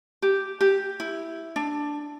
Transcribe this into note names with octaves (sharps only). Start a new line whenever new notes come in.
G4
G4
E4
D4